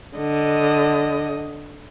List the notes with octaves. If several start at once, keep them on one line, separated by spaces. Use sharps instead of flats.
D3 D#5